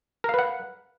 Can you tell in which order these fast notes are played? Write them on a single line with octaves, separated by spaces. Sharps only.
A#4 F5 B4 F#5